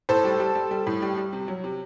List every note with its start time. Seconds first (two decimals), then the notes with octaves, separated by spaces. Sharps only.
0.09 A2 A4 C5
0.24 G3
0.40 G3
0.55 G3
0.71 G3
0.87 A2
1.02 G3
1.18 G3
1.33 C3
1.48 F#3
1.64 C3